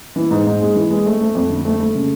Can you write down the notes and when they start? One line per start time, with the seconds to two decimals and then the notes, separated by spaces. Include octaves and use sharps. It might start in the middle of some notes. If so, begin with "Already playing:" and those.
0.16 E3
0.31 G#2
0.47 G#2
0.61 G#3
0.76 E3
0.91 G#3
1.06 A3
1.21 A3
1.35 F2
1.50 D3
1.65 A3
1.80 A3
1.95 C#3